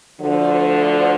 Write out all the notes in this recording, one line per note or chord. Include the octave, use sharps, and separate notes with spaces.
D2 D3 F3